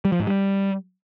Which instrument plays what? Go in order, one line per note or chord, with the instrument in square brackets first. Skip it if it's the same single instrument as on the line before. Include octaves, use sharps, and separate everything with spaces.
[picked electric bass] G3
F3
G#2
G3